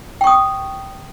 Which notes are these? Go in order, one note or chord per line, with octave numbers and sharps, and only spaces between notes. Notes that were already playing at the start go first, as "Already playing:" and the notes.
G5 C#6 D#6